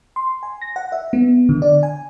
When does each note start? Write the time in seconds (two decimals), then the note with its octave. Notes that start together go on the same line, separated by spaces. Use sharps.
0.16 C6
0.43 G#5
0.61 A#6
0.76 F#5
0.92 E5
1.13 B3
1.49 D3
1.62 D5
1.83 G#5